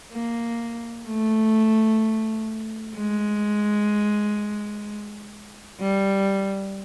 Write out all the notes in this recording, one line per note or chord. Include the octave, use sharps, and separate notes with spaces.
A#3
A3
G#3
G3